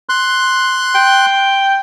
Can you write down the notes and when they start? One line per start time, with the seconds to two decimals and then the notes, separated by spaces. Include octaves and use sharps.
0.09 C6 F#6
0.95 G5